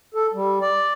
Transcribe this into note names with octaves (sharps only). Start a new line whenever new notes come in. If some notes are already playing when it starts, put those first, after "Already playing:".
A4
G3
D5